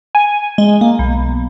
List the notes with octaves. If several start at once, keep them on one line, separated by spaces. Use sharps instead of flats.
G#5
G#3
A#3
B1